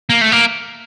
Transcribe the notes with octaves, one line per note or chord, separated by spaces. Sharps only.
A#3
A3
A#3